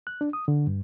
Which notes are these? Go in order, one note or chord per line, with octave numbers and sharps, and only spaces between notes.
F#6
D4
D#6
D3
G2